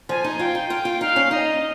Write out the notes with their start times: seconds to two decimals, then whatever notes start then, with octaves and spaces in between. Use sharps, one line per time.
0.09 F3 G#5
0.24 D#4
0.39 F4 G5
0.55 D#4
0.70 F4
0.85 F4
1.01 D#4 F5
1.16 C#4
1.31 D#4 D#5